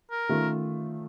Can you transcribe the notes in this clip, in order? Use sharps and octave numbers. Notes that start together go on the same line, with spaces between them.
A#4
D#3 A3 C#4 F4